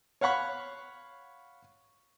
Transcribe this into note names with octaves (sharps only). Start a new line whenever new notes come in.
C#5 F5 F#5 B5 C#6